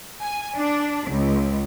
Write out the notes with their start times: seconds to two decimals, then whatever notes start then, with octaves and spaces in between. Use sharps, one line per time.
0.20 G#5
0.56 D4
1.07 C#2